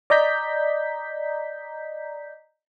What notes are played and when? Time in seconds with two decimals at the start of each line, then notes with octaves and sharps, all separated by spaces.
0.10 D5 D#5 A#5 G6 B6